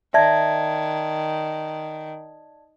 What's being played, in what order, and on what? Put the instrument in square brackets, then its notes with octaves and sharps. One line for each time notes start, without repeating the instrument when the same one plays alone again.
[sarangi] D#3 [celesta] D5 A5 G#6 [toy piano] E5